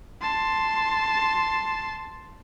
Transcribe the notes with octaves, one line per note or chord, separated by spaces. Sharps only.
A5 C6